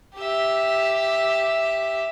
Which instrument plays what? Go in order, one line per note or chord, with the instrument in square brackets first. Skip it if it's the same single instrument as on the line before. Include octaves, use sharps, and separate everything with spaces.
[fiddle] G4 E5